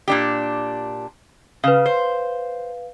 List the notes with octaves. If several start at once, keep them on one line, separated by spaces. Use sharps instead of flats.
A#2 D4 G4
C#3 B4 F5
C5